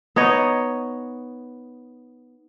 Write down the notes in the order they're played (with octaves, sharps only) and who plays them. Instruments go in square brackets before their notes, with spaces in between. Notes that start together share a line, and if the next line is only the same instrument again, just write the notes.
[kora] B3 D#4 C#5 D#5